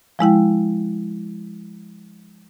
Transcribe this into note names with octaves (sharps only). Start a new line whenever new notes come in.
F3 G#3 E4 G5